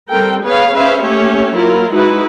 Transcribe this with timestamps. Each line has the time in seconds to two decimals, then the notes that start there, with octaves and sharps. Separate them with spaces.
0.10 G3 C4 A4 A#4 G5
0.44 B3 G#4 B4 C#5 F5
0.74 C#4 G#4 B4 C5 E5 F5
1.04 A3 A#3 C#4 G4 C#5 E5
1.55 F#3 A#3 E4 F4 A#4
1.92 G#3 D#4 E4 F#4 B4